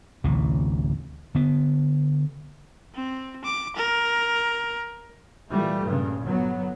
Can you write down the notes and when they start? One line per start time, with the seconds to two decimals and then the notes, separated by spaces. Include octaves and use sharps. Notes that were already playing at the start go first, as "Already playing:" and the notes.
0.24 A1 D2 C3 E3
1.35 D3 B3
2.95 C4
3.45 D6
3.76 A#4
5.51 A#2 E3 G3 A3
5.84 G2 A#2 C#3
6.24 G1 F#3 B3